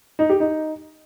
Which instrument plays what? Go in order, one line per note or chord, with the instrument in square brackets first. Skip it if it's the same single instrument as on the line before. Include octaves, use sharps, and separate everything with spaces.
[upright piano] D#4
G4
D#4